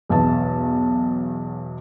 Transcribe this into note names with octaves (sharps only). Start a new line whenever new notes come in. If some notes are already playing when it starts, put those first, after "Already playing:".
B1 E2 A5